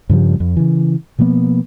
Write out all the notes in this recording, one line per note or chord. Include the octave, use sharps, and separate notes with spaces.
G2 C#3 F3 G3
F2
C#3 E3
B2 F3 A#3 B3